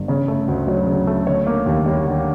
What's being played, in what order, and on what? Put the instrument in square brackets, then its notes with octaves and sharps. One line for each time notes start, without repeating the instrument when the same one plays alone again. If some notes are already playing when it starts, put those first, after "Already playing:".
Already playing: [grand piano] G1
C#3 C#5
A3
D2
F#3 C#5
C#3
A3
D3 C#5
A#3
D#2
G3 C#5
D3